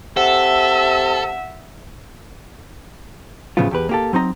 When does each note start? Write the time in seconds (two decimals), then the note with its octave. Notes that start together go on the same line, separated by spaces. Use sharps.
0.17 C3 A4 E5 F#5
3.57 A2 C#3 F3 F#3 B3 F4
3.71 E2 G4 B4
3.89 A#3 G4 A4
4.13 F#3 C4 D#4 A#5